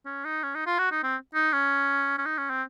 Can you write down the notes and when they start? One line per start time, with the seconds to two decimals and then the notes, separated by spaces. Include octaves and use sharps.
0.06 C#4
0.25 D#4
0.43 C#4
0.55 D#4
0.67 F4
0.79 F#4
0.92 D#4
1.04 C4
1.35 D#4
1.53 C#4
2.18 C#4
2.26 D#4
2.38 C#4
2.50 C4